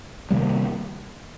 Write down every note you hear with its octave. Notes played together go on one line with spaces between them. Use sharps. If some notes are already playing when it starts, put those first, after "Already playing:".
C3 D#3 G3 A#3